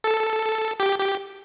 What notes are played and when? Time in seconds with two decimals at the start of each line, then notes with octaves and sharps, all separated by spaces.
0.04 A4
0.80 G4
0.99 G4